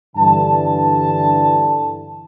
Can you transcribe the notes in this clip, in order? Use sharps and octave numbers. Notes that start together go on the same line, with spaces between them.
G2 D3 E3 A5